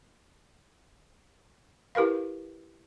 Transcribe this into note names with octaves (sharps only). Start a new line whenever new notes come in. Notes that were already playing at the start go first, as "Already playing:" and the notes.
E4 G4 A#4 B4 F5